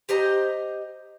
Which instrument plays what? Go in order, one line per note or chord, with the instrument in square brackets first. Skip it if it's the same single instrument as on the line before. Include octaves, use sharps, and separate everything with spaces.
[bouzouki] G4 C5 D#5 A#5